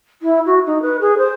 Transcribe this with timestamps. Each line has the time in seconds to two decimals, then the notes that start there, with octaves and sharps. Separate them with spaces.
0.21 E4
0.45 F#4
0.66 D#4
0.82 B4
1.01 G#4
1.17 C5